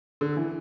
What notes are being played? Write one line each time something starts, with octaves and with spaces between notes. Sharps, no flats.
D3
E3